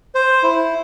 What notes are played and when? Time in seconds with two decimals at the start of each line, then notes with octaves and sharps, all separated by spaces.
0.15 C5
0.43 E4